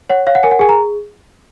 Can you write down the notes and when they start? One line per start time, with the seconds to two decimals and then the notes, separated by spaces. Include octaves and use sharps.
0.10 C#5 F#5
0.27 C#5 F5
0.35 F#5
0.43 A#4 G#5
0.51 F#5
0.59 G#4 G#5
0.69 A#5